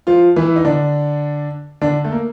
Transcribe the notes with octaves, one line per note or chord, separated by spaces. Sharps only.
F3 F4
E3 E4
D#4
D3 D4
D3 D4
A3
A#3